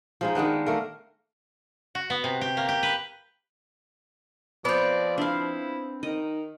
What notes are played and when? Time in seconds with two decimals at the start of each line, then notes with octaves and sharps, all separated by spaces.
0.21 F3 G#3 D#4
0.35 D#3 G#3 B3 D4
0.66 A3 A#3 A#4
1.95 F#4
2.10 B3
2.24 C3
2.41 G4
2.57 A#3
2.69 G4
2.83 B4
4.65 F3 B3 C4 D5
5.18 D4 E4 F5
6.03 D#3 D#4 D#5